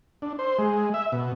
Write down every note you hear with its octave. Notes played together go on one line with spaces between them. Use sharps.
D4
C5
G#3
E5
B2